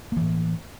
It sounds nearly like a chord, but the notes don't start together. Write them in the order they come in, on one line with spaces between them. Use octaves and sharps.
A#3 E3 A2